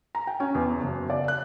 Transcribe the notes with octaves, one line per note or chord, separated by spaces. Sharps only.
A#5
G5
C#4
E2
F#1
D5
F#6